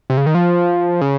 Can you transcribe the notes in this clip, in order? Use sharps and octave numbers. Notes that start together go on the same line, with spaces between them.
C3
C#3
D#3
F3
C#3